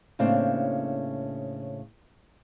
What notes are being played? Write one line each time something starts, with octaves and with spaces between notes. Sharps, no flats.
A2 C#3 A#3 C4 D4